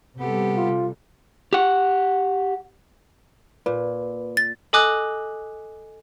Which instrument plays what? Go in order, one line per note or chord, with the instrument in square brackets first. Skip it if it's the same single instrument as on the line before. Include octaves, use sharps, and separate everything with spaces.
[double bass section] C3 G3 [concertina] B3 [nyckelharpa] G4 A4
[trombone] F4
[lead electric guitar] G4 F#5
[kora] A#2 [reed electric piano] B4
[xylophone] A6
A4 D#5 G#5 D6 D#6 F#6